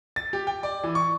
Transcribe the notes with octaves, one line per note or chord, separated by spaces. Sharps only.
A6
G4
G5
D5
E3
C#6